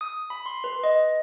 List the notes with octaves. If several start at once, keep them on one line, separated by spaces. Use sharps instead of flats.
D#6
B5
C6
B4
D#5